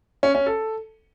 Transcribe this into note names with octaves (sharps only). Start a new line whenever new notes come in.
C#4
C#4
A4